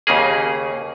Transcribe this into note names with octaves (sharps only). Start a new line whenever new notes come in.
D#2 C#3 A#3 G#4